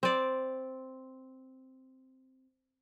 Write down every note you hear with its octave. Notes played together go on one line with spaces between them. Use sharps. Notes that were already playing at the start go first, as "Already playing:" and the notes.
C4 D5